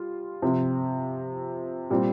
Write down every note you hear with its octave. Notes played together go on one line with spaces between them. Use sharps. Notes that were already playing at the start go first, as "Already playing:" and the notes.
Already playing: G3 F4
C3 F3 C4
A#2 G3 C4